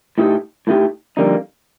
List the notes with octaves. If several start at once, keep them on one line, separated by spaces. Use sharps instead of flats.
A2 A3 D#4 G4
A2 A3 D#4 G4
F2 D3 G3 A#3 D#4